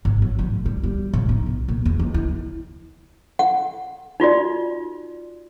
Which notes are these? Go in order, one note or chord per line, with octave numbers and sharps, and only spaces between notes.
G#1
F#3
A1
G3
G3
A2
D#4
B1
A#2
E2
C#2
E4
F#5
D#4 F4 F#4 D5